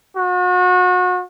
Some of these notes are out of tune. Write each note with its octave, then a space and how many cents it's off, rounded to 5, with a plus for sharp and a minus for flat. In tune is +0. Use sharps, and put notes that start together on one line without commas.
F#4 -35